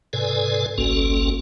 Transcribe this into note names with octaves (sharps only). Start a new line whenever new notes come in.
G#2 C3 A4 B4 D5 G#5
G1 C2 A#3 C#4 F#4 A4